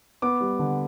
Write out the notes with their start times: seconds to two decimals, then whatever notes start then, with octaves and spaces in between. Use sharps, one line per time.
0.22 B3 D6
0.41 G3
0.59 D3